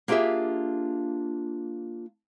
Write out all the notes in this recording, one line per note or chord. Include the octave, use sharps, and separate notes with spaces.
A#3 D4 F4 G4 G#4 E5